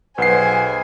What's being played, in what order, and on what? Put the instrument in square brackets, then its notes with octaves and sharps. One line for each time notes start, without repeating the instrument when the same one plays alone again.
[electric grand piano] B1 C7 [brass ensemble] G#4 C5 [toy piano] B4 F#5 [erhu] G#5